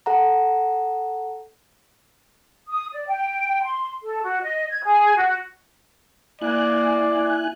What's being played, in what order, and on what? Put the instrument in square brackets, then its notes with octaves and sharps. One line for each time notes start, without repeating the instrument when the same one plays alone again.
[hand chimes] A4 F#5 A#5
[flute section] D#6
D5
G5
C6
A4
F#4
D#5
G#6
G#4
F#4
[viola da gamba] A#3 [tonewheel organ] E4 G#5 F#6 [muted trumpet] D5